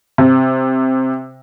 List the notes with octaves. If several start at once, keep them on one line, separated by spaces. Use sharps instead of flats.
C3